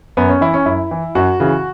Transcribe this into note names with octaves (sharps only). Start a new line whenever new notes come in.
F#2 B3
C#4
E3 E4
C#4
F#2 E4
E3
F#2 F#4
C#3 E3